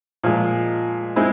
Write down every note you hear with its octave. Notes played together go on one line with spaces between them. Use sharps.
A#2 F3 G#3
G#3 C4 E4